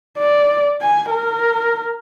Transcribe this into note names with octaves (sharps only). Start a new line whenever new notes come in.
D5
G#5
A#4